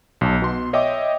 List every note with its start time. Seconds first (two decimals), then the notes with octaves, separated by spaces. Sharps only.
0.21 B1 A5
0.42 B2 C6
0.73 C#5 D#5 E5 G5 D6